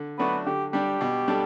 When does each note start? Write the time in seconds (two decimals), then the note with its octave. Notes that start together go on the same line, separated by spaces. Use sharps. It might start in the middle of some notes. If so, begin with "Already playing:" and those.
Already playing: D3
0.18 F#3 A3 B3 D4 F#4
0.46 D3 G4
0.73 G3 D4 G4
1.01 B2
1.28 G3 D4 A4